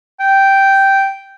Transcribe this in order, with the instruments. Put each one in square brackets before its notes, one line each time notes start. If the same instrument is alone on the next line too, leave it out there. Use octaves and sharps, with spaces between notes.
[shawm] G5